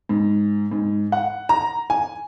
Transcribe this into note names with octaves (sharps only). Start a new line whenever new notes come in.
G#2
G#2
F#5
A#5
G#5